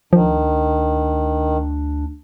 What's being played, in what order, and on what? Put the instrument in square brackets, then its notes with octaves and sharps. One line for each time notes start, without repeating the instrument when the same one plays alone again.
[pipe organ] D2 D4 [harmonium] D#3 [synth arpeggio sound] F3